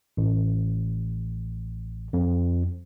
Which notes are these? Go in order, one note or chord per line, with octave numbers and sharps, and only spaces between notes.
A1
F2